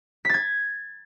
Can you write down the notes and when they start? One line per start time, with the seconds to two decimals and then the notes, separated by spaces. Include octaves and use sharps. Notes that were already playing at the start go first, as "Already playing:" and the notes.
0.25 B6
0.29 A6
0.34 G#6